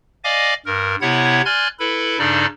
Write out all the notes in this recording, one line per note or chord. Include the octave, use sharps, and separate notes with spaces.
D5 D#5 F5 G#5 D6 A#6
G2 A#4
C3 B3 E4 C#5 F#5 G#6
D5 G#5 C6 F6 F#6 G#6
E4 A4 B4 B5
G2 C#3 D4 D#4 A4 D5